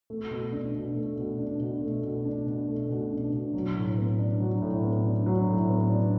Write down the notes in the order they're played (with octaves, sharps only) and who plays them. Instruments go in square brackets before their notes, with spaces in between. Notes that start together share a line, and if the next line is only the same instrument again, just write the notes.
[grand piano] A3
B2
D4
B2
A3
B2
D4
B2
A3
B2
D4
B2
A3
B2
D4
B2
F#3
A2
B3
D4
F#3
A2
B3
D4
F#3
A2
B3
D4